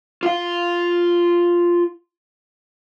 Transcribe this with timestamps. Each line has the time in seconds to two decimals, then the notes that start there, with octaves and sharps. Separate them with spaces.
0.23 F4 F5